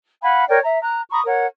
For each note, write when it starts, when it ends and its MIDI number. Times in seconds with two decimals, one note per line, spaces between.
0.22 0.44 77
0.22 0.44 78
0.22 0.44 80
0.22 0.44 83
0.48 0.59 70
0.48 0.59 73
0.48 0.59 74
0.48 0.59 79
0.64 0.81 76
0.64 0.81 82
0.81 1.01 82
0.81 1.01 90
1.10 1.21 82
1.10 1.21 83
1.10 1.21 85
1.10 1.21 87
1.25 1.46 70
1.25 1.46 73
1.25 1.46 78